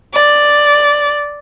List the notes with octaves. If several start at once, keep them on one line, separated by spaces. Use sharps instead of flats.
D5